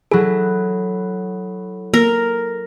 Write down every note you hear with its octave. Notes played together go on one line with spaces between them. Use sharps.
F#3 E4 G#4 A4
A#3 A#4